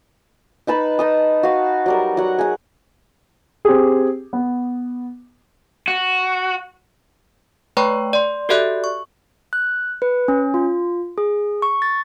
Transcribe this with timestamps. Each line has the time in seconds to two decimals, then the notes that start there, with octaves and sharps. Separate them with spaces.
0.67 D#4 B4 A5 B5
0.99 D#4 A5 D#6
1.43 F#4 F5
1.86 F#3 G3 A#4
2.17 F#3 F#5
2.39 G#4 F#5
3.65 C4 G4 G#4
4.33 B3
5.88 F#4
7.77 A3 B4 C#5 G5 A#5 C#6
8.13 D5 C6
8.49 F#4 G4 A4 D5 E5 F#6
8.84 C#6
9.53 F#6
10.02 B4
10.28 C#4
10.54 F4
11.18 G#4
11.62 C#6
11.82 A6